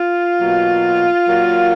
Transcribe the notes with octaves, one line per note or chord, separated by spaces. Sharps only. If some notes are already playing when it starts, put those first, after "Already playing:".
Already playing: F4
B2 F#3 A#3
A#2 F#3 A#3